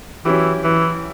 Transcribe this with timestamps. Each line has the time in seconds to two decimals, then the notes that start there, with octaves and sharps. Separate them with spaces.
0.25 E3 F#3 C#4 E4 G4
0.64 E3